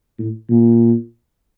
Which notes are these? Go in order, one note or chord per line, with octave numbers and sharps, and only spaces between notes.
A2
A#2